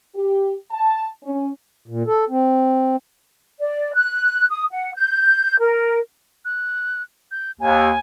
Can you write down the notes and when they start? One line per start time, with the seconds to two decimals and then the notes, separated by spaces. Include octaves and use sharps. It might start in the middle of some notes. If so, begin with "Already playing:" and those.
0.16 G4
0.71 A5
1.23 C#4
1.88 A#2
2.07 A4
2.30 C4
3.59 D5
3.95 F#6
4.49 D#6
4.71 F#5
4.95 G6
5.60 A#4
6.45 F#6
7.31 G6
7.60 D#2 G#5